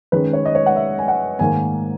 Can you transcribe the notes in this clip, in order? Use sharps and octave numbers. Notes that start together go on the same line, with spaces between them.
D#3 G#3 C#4 B4
C#5
D#5
C#5
F#5
E5
G#5
F#5
G#2 D#3 A#3 G#5